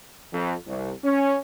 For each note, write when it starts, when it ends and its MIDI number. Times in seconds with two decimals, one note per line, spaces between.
0.33 0.55 41
0.67 0.92 36
1.04 1.37 61